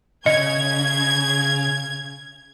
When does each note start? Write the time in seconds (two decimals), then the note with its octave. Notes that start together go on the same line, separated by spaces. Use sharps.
0.26 C#3 D#5 G#6